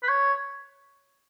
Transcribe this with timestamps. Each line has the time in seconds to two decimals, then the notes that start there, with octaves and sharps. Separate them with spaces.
0.03 B4
0.09 C#5